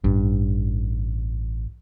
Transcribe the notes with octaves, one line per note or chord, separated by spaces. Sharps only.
A1 G2